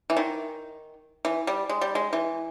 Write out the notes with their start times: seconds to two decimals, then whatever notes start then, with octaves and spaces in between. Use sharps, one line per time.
0.10 E3
0.17 D#3
1.25 E3
1.47 G3
1.69 G#3
1.81 G3
1.95 G#3
2.13 E3